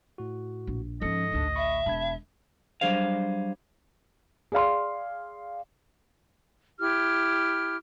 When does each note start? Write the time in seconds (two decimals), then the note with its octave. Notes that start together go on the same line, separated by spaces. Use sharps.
0.18 A2 F#4
0.67 A#1
1.01 G#2 F3 C#4 A4 D#5 C#7
1.31 A1 D2 D4
1.56 E5 B5 C#6
1.86 E1 A5 B5 G#6
2.81 F#3 G3 D4 G#4 C5 F5
4.52 G#4 D5 F5 C6
6.79 E4 G4 F6